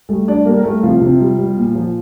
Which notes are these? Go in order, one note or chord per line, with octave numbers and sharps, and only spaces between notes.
G3 A3 A4
G3 D4 D5
G3 A#3 A#4
A#4
G3 A3 A4
C3 F3 F4
C3
G3
G3
A#2
F3